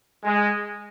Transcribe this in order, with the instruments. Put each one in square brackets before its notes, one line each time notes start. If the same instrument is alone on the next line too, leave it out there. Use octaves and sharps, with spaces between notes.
[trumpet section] G#3